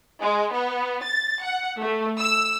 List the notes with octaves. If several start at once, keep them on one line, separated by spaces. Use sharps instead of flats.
G#3
B3
A6
F#5
A3
E6